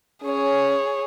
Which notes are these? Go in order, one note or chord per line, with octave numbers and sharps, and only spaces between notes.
C#4 G#4 C#5